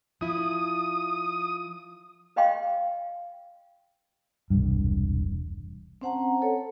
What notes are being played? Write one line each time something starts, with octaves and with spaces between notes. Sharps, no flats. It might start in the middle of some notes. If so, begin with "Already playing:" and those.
F3 E4 D#6
B4 D#5 F5 G5 C6
E1 C2 G2
C4 C#4 C5 F#5 A5 A#5
A4 C#5